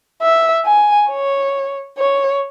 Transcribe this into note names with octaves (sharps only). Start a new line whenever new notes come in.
E5
G#5
C#5
C#5